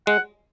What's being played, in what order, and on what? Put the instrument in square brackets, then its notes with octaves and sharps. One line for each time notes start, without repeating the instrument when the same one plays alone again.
[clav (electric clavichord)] G#3 [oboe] F#5